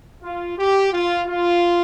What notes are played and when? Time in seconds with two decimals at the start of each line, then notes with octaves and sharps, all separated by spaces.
0.22 F4
0.57 G4
0.92 F4
1.27 F4